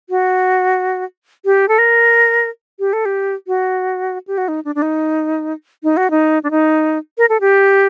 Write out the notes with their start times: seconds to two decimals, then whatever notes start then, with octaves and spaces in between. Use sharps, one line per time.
0.10 F#4
1.45 G4
1.68 A4
1.78 A#4
2.80 G4
2.93 A4
3.05 G4
3.47 F#4
4.28 G4
4.38 F#4
4.48 D#4
4.65 D4
4.75 D4
4.82 D#4
5.84 D#4
5.97 F#4
6.11 D#4
6.44 D4
6.51 D#4
7.18 A#4
7.29 A4
7.41 G4